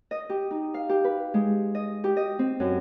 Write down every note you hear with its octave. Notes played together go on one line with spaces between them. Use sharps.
D#5
G4
D#4
F5
G4
B4
G#3
D#5
G4
D#5
C4
F#2